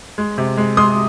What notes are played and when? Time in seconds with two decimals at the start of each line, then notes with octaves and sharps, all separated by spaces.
0.18 G#3
0.38 C3
0.57 G#3
0.77 G#3 C6 D#6